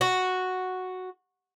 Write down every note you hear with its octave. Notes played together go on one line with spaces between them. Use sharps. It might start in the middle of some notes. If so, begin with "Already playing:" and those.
F#4